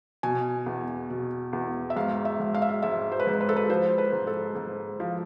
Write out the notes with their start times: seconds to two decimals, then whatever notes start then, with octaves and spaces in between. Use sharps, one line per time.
0.23 B2 G#5
0.66 E2
1.10 B2
1.53 E2
1.90 E5
1.96 G#2 F5
2.25 E5
2.40 G#2
2.54 F5
2.62 E5
2.69 F5
2.82 G#2 E5
3.12 C5
3.20 B4
3.27 G#2 C5
3.41 B4
3.49 A4
3.56 B4
3.69 F3 C5
3.98 B4
4.13 G#2
4.27 A4
4.56 G#2
5.00 F3